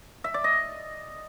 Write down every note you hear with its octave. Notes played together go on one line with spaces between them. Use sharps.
E5
D5
D#5